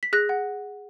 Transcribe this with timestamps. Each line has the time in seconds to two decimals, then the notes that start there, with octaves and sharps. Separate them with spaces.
0.03 B6
0.13 G#4 F#6 A#6
0.29 F#5